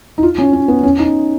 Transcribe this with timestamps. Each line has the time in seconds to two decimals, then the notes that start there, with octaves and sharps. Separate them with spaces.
0.18 D#4
0.23 F4
0.38 C#4
0.53 C#4
0.68 B3
0.83 C#4
0.99 D#4